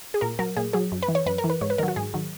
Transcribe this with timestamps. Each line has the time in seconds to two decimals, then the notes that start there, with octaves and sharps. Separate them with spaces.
0.14 G#4
0.21 A#2 A#4
0.39 F#3 A#4
0.57 A#2 G#4
0.73 F#3 G#4
0.92 F#2
1.03 B4
1.08 E3
1.15 C#5
1.26 F#2 B4
1.38 A#4
1.44 E3
1.50 B4
1.61 G#2 C#5
1.70 B4
1.78 D#3 F#3 A#4
1.88 F#4
1.96 G#2 G#4
2.14 D#3 F#3